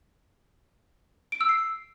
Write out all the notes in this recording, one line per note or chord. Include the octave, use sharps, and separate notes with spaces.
D7
E6
C7